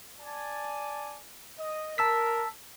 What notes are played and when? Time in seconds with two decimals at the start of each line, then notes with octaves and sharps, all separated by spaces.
0.21 D5 G#5 A5
1.59 D#5
1.98 A#4 A5 E6 B6